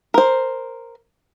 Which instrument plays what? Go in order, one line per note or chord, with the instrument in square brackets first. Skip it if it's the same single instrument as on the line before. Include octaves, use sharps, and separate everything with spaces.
[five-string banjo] A#4 C5